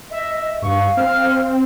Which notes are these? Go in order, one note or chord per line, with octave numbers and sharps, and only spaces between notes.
D#5 E5
G2 F5 C#6
C4 F6